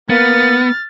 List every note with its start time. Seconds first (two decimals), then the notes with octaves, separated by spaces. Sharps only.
0.10 A#3 B3 F6 A6